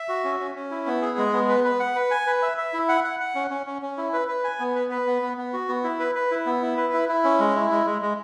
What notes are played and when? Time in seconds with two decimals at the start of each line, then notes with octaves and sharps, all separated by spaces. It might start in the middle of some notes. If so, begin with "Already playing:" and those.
Already playing: E5
0.09 F#4
0.24 C#4
0.40 C#4
0.55 C#4
0.71 E4
0.86 B3
1.02 G#4
1.18 G#3
1.33 B3
1.49 B4
1.64 B4
1.80 F#5
1.95 B4
2.11 G#5
2.27 B4
2.42 E5
2.58 E5
2.73 E4
2.89 F#5
3.04 F#5
3.20 F#5
3.35 C#4
3.51 C#4
3.66 C#4
3.82 C#4
3.97 E4
4.13 B4
4.28 B4
4.44 G#5
4.60 B3
4.75 B4
4.91 B4
5.07 B3
5.22 B3
5.37 B3
5.53 F#4
5.69 B3
5.84 E4
6.00 B4
6.15 B4
6.31 E4
6.46 B3
6.62 E4
6.77 B4
6.93 E4
7.09 E4
7.24 C#4
7.39 G#3
7.55 E4
7.71 G#3
7.86 G#3
8.02 G#3